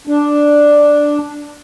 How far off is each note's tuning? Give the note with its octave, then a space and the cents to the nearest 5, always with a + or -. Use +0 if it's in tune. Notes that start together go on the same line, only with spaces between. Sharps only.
D4 +0